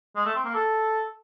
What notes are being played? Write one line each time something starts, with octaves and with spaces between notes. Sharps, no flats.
G#3
A3
C4
A#3
A4